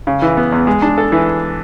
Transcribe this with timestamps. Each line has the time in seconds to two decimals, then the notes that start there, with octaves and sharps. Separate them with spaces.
0.07 C#3
0.22 E3
0.37 B3
0.52 E2
0.67 G#3
0.82 D4
0.98 A4
1.12 E3